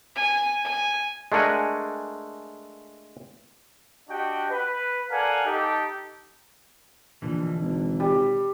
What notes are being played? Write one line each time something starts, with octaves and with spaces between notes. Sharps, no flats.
G#5
G#5
G#3 A3 D4 A#4 F#5 G#5
D4 F#4 G4 D#5 G5
B4
A4 A#4 D5 F5 F#5 G#5
D#4 G4 A4
A#1 B2 D3 E3
G#1
G3